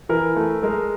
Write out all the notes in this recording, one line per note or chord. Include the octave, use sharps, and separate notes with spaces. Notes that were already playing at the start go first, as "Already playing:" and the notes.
E3 A#4
A3
G#3 A#4